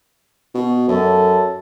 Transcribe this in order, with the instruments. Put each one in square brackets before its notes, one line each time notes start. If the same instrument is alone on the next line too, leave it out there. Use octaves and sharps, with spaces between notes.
[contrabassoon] B2
[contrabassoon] F#2 [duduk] A4